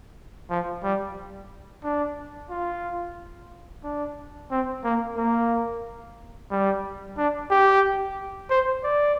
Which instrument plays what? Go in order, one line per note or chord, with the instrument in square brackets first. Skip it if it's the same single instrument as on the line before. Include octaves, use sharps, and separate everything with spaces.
[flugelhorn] F3
G3
D4
F4
D4
C4
A#3
A#3
G3
D4
G4
C5
D5